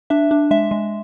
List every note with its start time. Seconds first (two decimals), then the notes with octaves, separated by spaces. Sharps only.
0.10 D4 E5
0.31 D4
0.51 G#3 E5
0.71 G#3